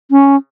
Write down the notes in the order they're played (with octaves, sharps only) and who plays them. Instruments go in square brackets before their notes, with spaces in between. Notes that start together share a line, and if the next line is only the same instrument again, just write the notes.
[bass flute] C#4